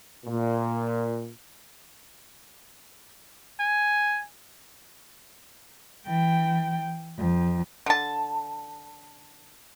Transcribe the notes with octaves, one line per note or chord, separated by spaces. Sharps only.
A#2
G#5
E3 G5
F2
D3 A5